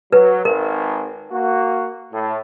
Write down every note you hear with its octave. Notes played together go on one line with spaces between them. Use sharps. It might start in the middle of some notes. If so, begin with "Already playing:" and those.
F#3 B4
G#1 A#4
A#3 F#4
A2